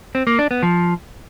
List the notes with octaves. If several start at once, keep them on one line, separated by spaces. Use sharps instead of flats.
C4
A#3
D4
B3
F3